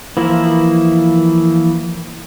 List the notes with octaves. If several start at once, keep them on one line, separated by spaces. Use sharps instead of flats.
E3 F3 A#3 E4